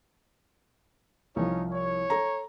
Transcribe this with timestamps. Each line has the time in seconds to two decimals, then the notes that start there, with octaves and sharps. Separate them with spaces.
1.36 C2 F3 C#4 D#4 C#5
1.72 C#5
2.10 A4 A#5